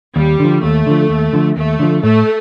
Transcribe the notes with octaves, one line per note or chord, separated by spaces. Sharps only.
D#2 G3
D3 F3
D#2 A3
D3 F3
D#2
D3 F3
D#2 A3
D3 F3
A2 A3